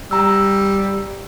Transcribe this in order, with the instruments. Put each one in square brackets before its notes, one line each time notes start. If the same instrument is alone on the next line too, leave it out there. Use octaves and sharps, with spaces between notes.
[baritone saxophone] G3 [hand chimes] A#5 E6